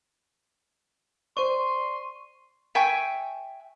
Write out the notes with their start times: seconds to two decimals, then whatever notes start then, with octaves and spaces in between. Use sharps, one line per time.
1.37 C5 D5 C6 C#6 D#7
2.75 E5 G5 G#5 C#6